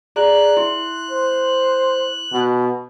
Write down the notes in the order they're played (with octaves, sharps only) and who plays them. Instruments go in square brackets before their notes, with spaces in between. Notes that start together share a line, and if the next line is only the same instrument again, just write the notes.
[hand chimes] G#4 D5 A#5 [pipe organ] F#6
[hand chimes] E4 C6
[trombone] C5
B2